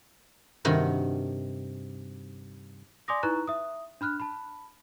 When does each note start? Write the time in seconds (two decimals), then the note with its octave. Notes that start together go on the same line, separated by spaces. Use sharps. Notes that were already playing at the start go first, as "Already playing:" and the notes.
0.65 G2 C3 D#3 F#4
3.08 D5 G#5 C6 D6 D#6 A#6
3.23 D#4 E4 B4 A#5 C#6 F#6
3.47 E5 D#6
4.01 D4 B5 F6 F#6
4.20 A5 B5